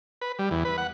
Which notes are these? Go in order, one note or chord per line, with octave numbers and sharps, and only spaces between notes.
B4
G3
E2
B4
F#5